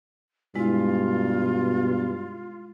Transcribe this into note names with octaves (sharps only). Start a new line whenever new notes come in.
G2 B2 G#3 E4 F4